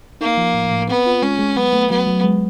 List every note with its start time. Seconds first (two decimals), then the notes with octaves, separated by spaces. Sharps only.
0.21 A#3 D#4
0.38 F3
0.54 A2
0.71 A2
0.89 B3 C4
1.06 F4
1.22 G#3 C#4
1.39 G#3
1.56 F#3 B3
1.73 A3
1.90 F#3 B3
2.07 F#3
2.24 G#3